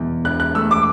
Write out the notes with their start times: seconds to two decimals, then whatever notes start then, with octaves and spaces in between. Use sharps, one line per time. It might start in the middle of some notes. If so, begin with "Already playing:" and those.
Already playing: E2 B2
0.24 E1 F#6
0.40 F#6
0.55 A3 E6
0.71 D6